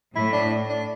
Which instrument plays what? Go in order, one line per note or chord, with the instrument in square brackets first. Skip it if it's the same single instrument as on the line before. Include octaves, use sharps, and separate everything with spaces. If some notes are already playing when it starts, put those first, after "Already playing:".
[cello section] A2 [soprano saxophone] E4
[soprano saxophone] D4
D4